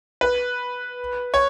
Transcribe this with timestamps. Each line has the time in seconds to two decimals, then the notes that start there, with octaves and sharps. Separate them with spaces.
0.21 B4
1.34 C#5